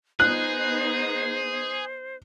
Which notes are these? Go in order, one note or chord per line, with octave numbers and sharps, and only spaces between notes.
B3 D#4 G#4 C5 F#6